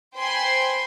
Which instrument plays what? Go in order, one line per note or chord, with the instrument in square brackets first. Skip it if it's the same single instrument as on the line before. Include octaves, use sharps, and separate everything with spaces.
[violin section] C5 G5 G#5 B5 C6